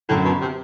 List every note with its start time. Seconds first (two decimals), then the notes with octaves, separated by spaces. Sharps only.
0.09 F#2 A2 D3 F#3
0.25 B2
0.41 C3